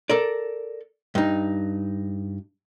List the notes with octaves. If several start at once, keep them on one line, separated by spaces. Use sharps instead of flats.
A4 A#4 D5
G2 D#4